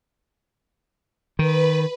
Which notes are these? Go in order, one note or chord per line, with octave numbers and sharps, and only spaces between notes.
D#3 B4